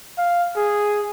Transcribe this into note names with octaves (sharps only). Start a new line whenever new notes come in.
F5
G#4